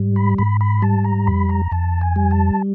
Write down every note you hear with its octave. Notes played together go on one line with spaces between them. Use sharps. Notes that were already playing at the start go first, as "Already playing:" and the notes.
Already playing: G#2 G3
B5
G#2 B5
B5
G3 A5
A#5
F2 B5
A#5
F2 A5
G#5
G3
A5